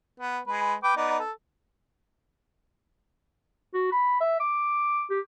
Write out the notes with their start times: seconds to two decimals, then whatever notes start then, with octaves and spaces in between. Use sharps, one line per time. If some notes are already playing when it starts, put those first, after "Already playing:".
0.20 B3
0.48 G#3 B4
0.83 B4 G5 D6
0.96 B3 D#4 D5
1.19 A4
3.74 F#4
3.92 B5
4.21 E5
4.40 D6
5.10 G4